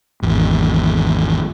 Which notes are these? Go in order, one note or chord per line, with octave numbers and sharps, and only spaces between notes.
G#1 E2